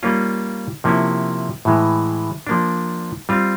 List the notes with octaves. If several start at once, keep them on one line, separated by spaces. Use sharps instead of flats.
G3 A#3 C#4 F4
C3 F3 A#3 C#4 E4
A2 E3 G#3
F3 A#3 D4
G3 C4 F4